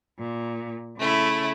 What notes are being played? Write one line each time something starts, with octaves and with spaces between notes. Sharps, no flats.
A#2
C#3 A3 E4